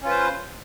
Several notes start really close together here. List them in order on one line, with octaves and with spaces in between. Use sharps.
C#4 F4 B4 C5